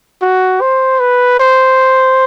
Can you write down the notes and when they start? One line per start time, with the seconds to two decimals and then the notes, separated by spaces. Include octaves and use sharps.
0.22 F#4
0.61 C5
1.00 B4
1.39 C5